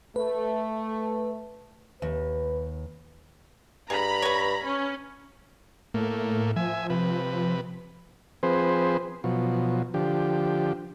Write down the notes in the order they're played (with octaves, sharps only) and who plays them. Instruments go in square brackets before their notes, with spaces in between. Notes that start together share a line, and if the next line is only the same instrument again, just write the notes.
[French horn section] A3 [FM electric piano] B4
[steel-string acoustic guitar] D#2 [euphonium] B4
[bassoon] G2 [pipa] G#4 [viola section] A#5 B5
[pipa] B4 C#5
[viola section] C#4
[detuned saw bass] A2 [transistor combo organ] A3 A#3
[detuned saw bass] F3 [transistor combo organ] E5 G#5
[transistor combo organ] C3 B4
F3 C4 G#4 B4 C5
B2 F3 F#3
D3 F3 G4